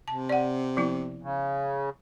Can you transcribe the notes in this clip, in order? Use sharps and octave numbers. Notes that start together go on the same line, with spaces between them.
C3 A5
D5 F#5
F3 B3 E4
C#3